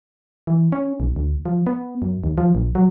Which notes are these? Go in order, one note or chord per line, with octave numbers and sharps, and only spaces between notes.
E3
C#4
B1
D2
F3
B3
F#2
D#2
F3
A#1
F#3